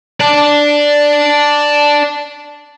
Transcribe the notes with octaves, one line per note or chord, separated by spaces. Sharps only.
D5 A5